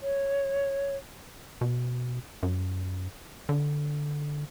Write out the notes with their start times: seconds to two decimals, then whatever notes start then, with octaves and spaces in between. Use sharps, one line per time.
0.01 C#5
1.61 B2
2.43 F#2
3.49 D3